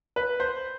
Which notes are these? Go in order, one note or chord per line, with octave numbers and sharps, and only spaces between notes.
B4
C5